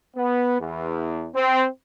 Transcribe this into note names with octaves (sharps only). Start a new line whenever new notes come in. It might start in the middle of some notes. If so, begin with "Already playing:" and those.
B3
E2
C4